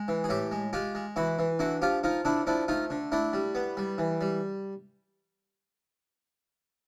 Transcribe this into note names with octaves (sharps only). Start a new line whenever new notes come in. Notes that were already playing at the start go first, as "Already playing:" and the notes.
Already playing: G#3
E3
G#4
A2 G4 A4
G#3
G#3 F4 G4
G#3
E3 E4 F#4
E3
D3 E4 F#4
F3 F4 G4
F3 D#4 F4
D3 D4 E4
F3 D4 E4
A3 D#4 F4
D3
A3 D4 E4
G3
B3
G3
E3
G3